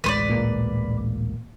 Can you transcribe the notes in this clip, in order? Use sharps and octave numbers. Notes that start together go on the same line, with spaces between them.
D1 A1 G#3 B4 C5 D5
A#2 A#3